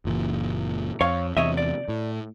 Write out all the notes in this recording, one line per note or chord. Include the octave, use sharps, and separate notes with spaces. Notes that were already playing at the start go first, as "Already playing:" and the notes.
F#1 A#2 E3
F2 C#5 F5
E2 C3 C#5 D#5 E5
D5
A2